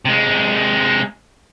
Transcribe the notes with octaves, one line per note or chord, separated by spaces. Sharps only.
C3 G#3